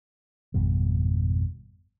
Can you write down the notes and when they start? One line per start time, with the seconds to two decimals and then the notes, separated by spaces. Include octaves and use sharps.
0.54 G#1 F2 B2 G3